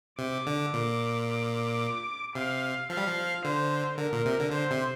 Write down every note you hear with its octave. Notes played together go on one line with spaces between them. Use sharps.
C3 D6
D3
A#2
D6
C3 F5
F3 F5
G3
F3
D3 C5
D3 A#4
A#2
C3
D3
D3 C5
C3